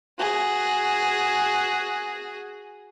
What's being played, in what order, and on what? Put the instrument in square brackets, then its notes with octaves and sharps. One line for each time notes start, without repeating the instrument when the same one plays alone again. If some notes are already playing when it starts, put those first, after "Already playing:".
[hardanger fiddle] F#4 G#4